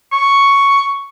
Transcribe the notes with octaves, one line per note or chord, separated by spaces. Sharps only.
C#6